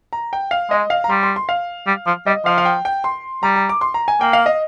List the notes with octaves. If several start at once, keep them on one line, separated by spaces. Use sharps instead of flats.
A#5
G5
F5
G#3 D#5
F5
A#5
G3 C6
C6
C6
F5
G3
F3
G3 D#5
F3 F5
F5
G5
G5
C6
G3 A#5
A#5
D6
C6
A#5
G#5
A#3 G5
F5
D#5